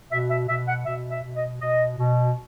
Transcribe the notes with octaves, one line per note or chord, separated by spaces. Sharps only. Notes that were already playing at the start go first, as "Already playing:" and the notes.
B2 E5
E5
B2 E5
F#5
B2 E5
E5
B2
D#5
B2 D#5
B2